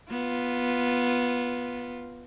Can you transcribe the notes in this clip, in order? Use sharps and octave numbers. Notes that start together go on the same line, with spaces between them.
B3 F4